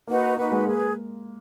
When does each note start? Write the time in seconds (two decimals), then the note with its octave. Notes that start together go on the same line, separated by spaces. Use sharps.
0.07 A#3 D#4 F#4 B4 F#5
0.36 A#3 D#4 F#4 B4 F#5
0.52 G#3
0.66 A#3 G#4 B4